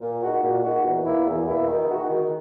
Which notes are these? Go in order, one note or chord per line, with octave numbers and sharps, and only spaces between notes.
A#2
G#3 D#4 F#4
A#2
G#3 D#4 F#4
E2
B2 A#3 E4
E2
B2 A#3 E4
D#3
G#3 D#4 F#4
D#3